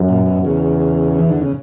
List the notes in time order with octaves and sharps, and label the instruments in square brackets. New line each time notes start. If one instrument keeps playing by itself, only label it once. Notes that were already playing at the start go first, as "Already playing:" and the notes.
Already playing: [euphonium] F#2
[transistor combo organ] A#2
B2
[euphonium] E2 [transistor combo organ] C#3
[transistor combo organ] E3
D3
C#3